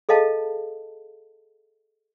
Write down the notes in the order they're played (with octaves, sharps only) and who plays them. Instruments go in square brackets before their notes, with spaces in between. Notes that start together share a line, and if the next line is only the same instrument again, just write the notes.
[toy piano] G#4 A4 D#5 F5 A5